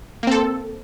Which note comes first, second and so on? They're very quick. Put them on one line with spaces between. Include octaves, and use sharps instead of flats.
A#3 C4 A4